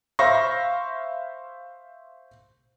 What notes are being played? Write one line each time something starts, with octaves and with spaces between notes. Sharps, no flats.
C5 E5 F5 B5 C#6 A#6